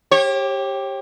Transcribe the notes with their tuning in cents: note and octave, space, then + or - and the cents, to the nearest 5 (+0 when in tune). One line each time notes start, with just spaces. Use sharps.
G4 +0 C#5 -40